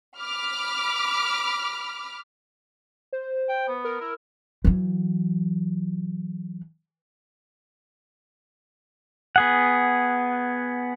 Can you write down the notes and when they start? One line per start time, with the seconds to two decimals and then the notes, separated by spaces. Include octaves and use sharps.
0.19 B5 D6 F6
3.13 C5
3.49 G5
3.68 B3
3.84 A#4
4.01 E4 A#4
4.65 E3 F#3
9.36 B3 G#4 F#5